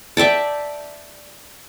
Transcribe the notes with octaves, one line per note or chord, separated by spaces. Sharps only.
D5 E5 G5 A5